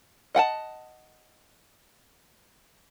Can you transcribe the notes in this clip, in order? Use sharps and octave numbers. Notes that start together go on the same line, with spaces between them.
D#5 F#5 G5 A5